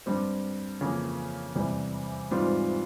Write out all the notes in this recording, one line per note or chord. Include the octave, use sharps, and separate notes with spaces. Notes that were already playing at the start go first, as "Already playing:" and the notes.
G2 G3 C4
F2 C#3 E3 A#3
E2 C3 E3 G3
G#2 E3 G3 C4 F4